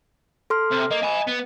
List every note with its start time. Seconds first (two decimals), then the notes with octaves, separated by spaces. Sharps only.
0.50 A4 C6 F6
0.71 C3
0.91 A#3 D#5
1.03 G#5 B5
1.27 B3